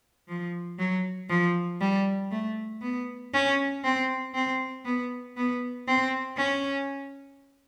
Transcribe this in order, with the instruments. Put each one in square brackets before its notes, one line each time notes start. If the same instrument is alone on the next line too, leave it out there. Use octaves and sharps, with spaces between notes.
[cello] F3
F#3
F3
G3
A3
B3
C#4
C4
C4
B3
B3
C4
C#4